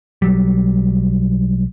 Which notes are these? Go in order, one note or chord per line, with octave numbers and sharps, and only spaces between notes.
B1 F#3 G3